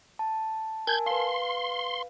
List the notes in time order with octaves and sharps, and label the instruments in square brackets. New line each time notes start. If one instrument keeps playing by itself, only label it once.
[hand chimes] A5
[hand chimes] A#4 G#5 A5 [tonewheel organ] G6 G#6
[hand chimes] B4 F5 [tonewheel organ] C6